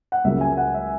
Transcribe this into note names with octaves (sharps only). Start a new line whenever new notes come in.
F#5
C#2 C#3 F#3 A#3 E5
G#5
F#5
E5